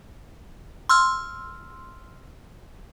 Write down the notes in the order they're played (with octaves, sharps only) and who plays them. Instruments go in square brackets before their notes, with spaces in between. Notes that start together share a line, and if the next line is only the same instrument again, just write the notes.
[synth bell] C6 E6 F6